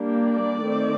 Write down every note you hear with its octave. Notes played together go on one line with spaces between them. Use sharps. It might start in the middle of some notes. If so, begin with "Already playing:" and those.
Already playing: G3 A#3 D4
D5
D#3 A3 C4